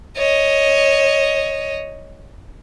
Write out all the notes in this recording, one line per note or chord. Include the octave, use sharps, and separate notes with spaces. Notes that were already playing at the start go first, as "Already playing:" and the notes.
C#5 D#5